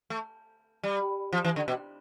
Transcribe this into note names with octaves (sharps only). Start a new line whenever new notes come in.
A3
G3
F3
E3
D3
B2